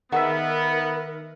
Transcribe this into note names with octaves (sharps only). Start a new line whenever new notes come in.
D#3 B3 D#4 G#4 A#4 E5 F#5